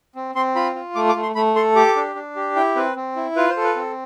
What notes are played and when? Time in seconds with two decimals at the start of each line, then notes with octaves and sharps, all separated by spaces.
0.15 C4
0.35 C4 C6
0.55 F4 B5
0.75 F4
0.95 A3 D6
1.09 D6
1.16 A3
1.22 C6
1.35 A3 B5
1.56 A4 C6
1.76 G4 D6
1.96 D4
2.16 D4
2.36 G4
2.56 E4 G5
2.76 C4 B4
2.96 C4
3.16 E4
3.36 F4 B4
3.50 C5
3.56 A4
3.64 B4
3.76 C4